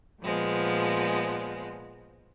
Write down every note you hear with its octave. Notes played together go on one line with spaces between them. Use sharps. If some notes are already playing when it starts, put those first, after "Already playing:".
A#2 F3 G#3 B3